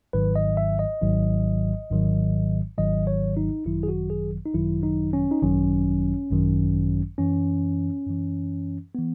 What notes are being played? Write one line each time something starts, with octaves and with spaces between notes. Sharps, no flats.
G#1 G#2 D#3 F#3 B4
D#5
E5
D#5
G#1 G#2 D#3 F#3
G#1 G#2 D#3 F#3
G#1 G#2 D#3 F#3 D#5
C#5
D#4
G#1 F#2 D#3 F#3 E4
G#4
F#4
G#4
D#4
G#1 F#2 D#3 F#3 E4
D#4
C#4
D#4
G#1 F#2 D#3 F#3 C#4
G#1 F#2 D#3 F#3
F#2 E3 C#4
F#2 E3
E3 B3